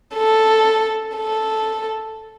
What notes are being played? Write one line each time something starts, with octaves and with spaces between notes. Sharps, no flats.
A4
A4